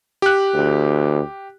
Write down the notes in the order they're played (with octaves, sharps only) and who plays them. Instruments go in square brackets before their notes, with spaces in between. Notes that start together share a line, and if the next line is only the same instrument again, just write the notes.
[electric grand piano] G4 F#6
[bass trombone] D2